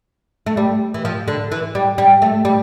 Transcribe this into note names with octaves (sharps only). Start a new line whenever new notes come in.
A3
G3
E3
F3
D3
E3
G3
G3
A3
G3